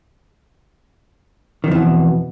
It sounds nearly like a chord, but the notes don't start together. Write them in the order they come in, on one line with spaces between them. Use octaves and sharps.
D#3 F2 E3 B2